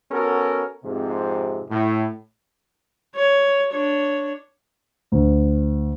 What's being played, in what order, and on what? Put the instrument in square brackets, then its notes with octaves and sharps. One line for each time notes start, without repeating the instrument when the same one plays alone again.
[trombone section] B3 C#4 F#4 A4 A#4
F2 G#2 C3
A2
[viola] C#5
D4 C#5
[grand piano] D2